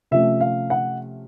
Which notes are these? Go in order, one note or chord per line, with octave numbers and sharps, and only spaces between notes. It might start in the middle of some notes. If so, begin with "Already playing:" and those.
C3 F3 A3 C#4 E5
F5
F#5